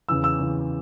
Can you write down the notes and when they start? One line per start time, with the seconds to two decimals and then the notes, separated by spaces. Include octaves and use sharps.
0.09 E2 C#3 E3 E6
0.24 E6
0.39 E2 C#3 E3